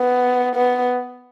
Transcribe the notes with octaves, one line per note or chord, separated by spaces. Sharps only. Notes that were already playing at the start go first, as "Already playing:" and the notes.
Already playing: B3
B3